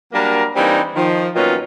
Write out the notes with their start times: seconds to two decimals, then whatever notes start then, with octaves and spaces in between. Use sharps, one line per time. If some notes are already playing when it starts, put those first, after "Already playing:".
0.13 F#3 G3 A#3 D4 A#4
0.55 E3 G3 A#3 C4 D4 D#4
0.95 D#3 F3
1.35 A#2 D#3 F#3 B3 C#4 F4